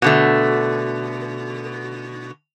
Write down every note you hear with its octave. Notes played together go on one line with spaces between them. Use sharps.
B2 D3 A3